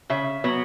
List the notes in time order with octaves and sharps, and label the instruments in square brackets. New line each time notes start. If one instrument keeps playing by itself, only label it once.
[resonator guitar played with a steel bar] C#3 E5
F#3 B3